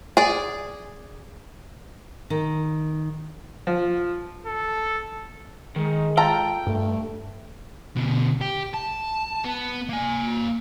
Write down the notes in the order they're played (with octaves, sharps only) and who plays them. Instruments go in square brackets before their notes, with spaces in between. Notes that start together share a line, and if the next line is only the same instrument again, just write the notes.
[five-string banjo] G#4 D5
[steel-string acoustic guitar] D#3
[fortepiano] F3
[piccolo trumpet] A4
[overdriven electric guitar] D#3 [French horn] G#3
[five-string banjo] F4 A4 A#5 [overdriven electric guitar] G5
[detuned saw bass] G2 [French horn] A3
[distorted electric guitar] B2 D3
G4
A5
B3
A#3 G#5